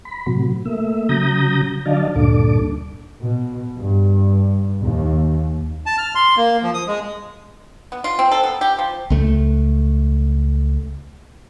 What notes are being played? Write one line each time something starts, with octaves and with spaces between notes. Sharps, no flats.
B5
A2 C3 F#3
A3 A#3 E5
C#3 F#3 A#5 D#6 G6 A#6
D3 F#3 D5 D#5 F5 A5
D2 G2 A#2 D4 A4 D6
B2
G2
D#2
A5
F6
C6
A#3
F3
D#6
G#3
B3
F4
C4
A4
B3
G4
F3
C#2 A3